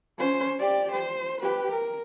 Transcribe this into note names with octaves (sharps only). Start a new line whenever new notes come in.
C#4 C5
G4 D5
C5
G4 B4
A#4